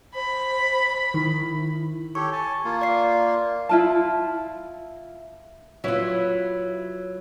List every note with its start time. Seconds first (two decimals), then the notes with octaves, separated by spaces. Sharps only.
0.15 C5 B5
1.14 D#3 E4
2.15 G4 A4 C#5 C#6
2.32 G#5 A5
2.64 A#3 F4
2.82 D5 C7
3.69 E4 F4 A5
5.84 F#3 E4 F4 B4 C#5